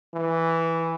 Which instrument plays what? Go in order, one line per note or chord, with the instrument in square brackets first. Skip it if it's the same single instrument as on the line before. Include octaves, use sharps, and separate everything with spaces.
[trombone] E3